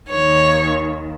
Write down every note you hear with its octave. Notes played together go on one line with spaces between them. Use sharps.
D#2 D#3 C#5